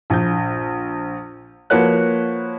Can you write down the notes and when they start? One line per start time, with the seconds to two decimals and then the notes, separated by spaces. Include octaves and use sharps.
0.10 A#1 G6
1.70 F3 A#3 F#4 B4 C#5 F#6